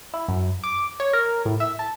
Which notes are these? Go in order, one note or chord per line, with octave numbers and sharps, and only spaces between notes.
E4
F#2
D6
C#5
A#4
A2
E5
A5